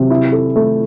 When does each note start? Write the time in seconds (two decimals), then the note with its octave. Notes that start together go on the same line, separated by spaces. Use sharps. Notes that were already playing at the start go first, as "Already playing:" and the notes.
Already playing: C3 F#3
0.10 E4
0.32 A4
0.56 A3